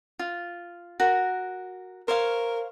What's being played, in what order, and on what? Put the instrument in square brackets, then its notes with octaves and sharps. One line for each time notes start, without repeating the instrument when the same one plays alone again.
[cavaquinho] F4
F#4 A#4
[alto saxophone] A#4 [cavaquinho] C5 C#5 F5